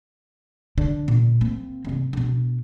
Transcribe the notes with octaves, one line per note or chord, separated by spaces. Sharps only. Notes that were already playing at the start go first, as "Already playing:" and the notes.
D3 D4
A#2
A#3 C4
D#1 C3
B2 D4